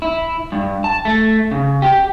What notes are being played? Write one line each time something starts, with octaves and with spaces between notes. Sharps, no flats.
E4
G2
A5
A3
C#3
G4